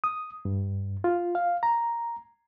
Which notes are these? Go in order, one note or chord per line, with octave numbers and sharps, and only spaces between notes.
D#6
G2
F4
F5
A#5